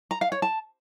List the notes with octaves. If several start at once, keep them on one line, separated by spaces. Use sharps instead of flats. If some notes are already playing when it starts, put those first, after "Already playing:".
A#5
F5
C#5
A5